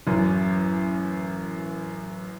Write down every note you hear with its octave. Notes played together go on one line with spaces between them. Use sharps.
A1 F#2